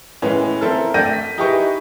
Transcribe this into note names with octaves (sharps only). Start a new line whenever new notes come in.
A2 E3 G#3 B3 C#4
C4 E4 A4 A#4
A3 D4 G5 G6 A#6 D#7
B6
D#4 E4 G4 G#4 B4 C#6